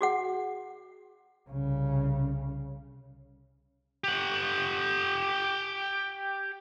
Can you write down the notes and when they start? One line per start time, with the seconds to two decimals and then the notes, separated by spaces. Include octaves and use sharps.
0.01 F#4 G#4 F#5
1.50 C2 C#3
4.04 G4 F#5